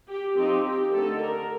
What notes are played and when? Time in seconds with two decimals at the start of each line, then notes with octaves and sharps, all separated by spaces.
0.09 G4
0.37 F3 C4 D#4 G4
0.64 G4
0.92 D3 A3 D#4 A4
1.21 A#4